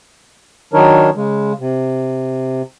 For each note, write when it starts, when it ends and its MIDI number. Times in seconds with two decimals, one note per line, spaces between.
0.73 1.10 51
0.73 1.10 54
0.73 1.10 62
0.73 1.10 63
0.73 1.10 70
0.73 1.10 73
1.15 1.53 49
1.15 1.53 56
1.59 2.62 48